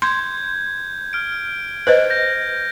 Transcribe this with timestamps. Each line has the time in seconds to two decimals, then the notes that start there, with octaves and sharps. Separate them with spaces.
0.02 C6 G6 G#6
1.13 F6 D7
1.87 B4 C5 D#5
2.10 G6 A#6